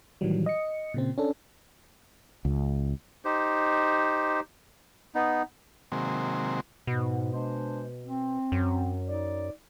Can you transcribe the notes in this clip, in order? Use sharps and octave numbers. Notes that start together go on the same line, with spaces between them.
A2 D#3 E3 F#3 G3
D#5 C#7
A#2 C#3 C4
C#4 D4 A4
C#2
D#4 G4 C5
B3 D#4
C3 D#3 F#3 G#3 A#3 C4
G#2 B2
G#3 D4 C5
C4
F#2
D#4 D5